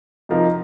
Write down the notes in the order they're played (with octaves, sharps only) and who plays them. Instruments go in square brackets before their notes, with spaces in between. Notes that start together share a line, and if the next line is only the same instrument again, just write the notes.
[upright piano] C3 F3 D#4 A#4